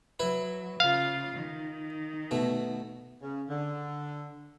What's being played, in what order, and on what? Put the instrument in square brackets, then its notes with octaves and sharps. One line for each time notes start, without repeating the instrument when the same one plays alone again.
[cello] F#3 [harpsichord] E4 B4
[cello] C#3 F4 [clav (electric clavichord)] F5
[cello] D#3
[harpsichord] B2 A3
[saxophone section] C#3
D3